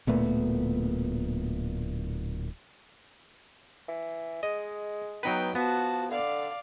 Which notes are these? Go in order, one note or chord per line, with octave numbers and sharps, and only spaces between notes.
D1 A#2 A3 B3
E3
G#3 D#5
F#3 B3 D#4 B4 G5
F3 B3 F#4 A5
D3 D5 F5